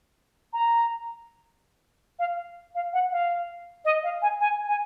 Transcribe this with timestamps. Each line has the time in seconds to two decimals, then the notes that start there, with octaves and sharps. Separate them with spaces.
0.53 A#5
2.19 F5
2.75 F5
2.93 F#5
3.12 F5
3.85 D#5
4.04 F5
4.22 G#5
4.40 G#5
4.68 G#5